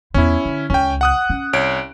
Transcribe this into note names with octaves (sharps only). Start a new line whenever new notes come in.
E2 B3 C#4 E4
D3
C#2 C#4 G5
F#5 D#6 F#6
C#4
C2 C#5 D7